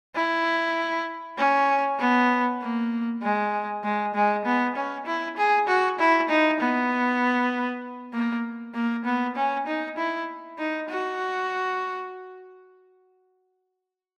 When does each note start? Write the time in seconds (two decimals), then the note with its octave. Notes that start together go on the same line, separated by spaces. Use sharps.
0.15 E4
1.38 C#4
1.99 B3
2.61 A#3
3.23 G#3
3.84 G#3
4.15 G#3
4.45 B3
4.76 C#4
5.06 E4
5.37 G#4
5.67 F#4
5.99 E4
6.29 D#4
6.60 B3
8.13 A#3
8.75 A#3
9.05 B3
9.35 C#4
9.67 D#4
9.97 E4
10.58 D#4
10.89 F#4